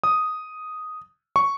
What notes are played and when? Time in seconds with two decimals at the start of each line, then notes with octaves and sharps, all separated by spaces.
0.04 D#6
1.36 C#6